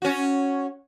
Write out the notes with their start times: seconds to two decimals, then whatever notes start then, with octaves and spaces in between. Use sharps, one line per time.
0.02 C#4 F#4